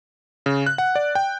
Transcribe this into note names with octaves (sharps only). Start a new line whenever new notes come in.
C#3
F#6
F#5
D5
G5